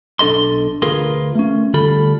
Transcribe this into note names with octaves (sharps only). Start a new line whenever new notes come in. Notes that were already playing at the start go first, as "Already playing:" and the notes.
B1 D4 A4 D#5 C6
D2 F4 G#4 A#4 B4 C6
A3 C#4
D2 G3 F4 A4 B5